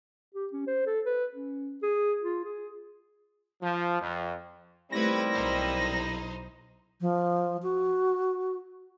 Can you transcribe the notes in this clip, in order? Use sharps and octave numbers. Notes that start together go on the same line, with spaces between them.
G4
C#4
C5
A4
B4
C#4
G#4
F4
G#4
F3
F2
D#2 G3 A3 C4 E4 B4 G#6 A#6
B1 D#4 C5
F3
F#4